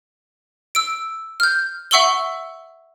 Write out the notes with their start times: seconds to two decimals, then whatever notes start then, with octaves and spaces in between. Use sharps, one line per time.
0.75 E6 D7
1.40 F6 G6
1.91 E5 F#5 C#6 E6 F#7 G7